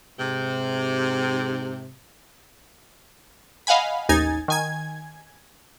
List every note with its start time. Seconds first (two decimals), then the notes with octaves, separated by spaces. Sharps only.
0.19 G#2 C3
3.67 D#5 F5 F#5 G#5 B5
4.09 A1 D#2 D#4 G#5 G#6 A6
4.48 D#3 G#5 G#6